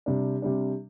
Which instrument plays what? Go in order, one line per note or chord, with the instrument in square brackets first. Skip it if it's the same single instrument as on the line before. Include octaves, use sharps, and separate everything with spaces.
[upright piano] C3 G3 D4
C3 G3 D4